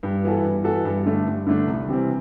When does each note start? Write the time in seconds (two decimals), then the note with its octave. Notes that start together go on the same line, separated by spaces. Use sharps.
0.03 G2
0.24 E3 B3 F#4 A4
0.44 G2
0.64 E3 B3 F#4 A4
0.85 G2
1.06 D3 A3 D4
1.27 G2
1.47 D3 A3 D4
1.68 C2
1.88 C3 E3 G3 C4